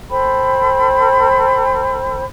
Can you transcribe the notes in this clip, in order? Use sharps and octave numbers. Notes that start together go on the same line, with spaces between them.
A4 C5 G5 B5